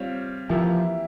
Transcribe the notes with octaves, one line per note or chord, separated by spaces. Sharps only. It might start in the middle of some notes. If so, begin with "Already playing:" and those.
Already playing: G3 C4 F4 C#5
E3 F3 A#3 E4 G4